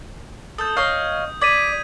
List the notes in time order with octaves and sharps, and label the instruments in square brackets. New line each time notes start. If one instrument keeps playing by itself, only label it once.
[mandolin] A4 [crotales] D#6 G6
[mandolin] C#5 D#5 F5
[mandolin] D5 [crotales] G#6 B6 D#7